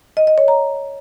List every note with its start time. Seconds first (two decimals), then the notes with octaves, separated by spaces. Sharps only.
0.17 D#5
0.27 D#5
0.38 C#5
0.48 A#5